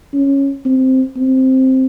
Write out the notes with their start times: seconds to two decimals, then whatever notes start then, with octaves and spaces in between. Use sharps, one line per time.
0.14 C#4
0.65 C4
1.17 C4